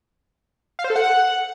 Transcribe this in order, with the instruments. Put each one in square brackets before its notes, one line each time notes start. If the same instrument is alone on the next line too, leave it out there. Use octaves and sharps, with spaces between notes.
[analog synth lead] F5
C5
A4
F#5